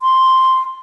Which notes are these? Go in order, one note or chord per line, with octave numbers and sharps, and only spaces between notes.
C6